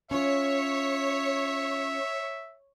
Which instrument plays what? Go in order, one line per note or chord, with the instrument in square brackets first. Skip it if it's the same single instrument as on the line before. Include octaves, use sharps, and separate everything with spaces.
[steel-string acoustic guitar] C#4 F4 [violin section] C#5 [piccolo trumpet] E5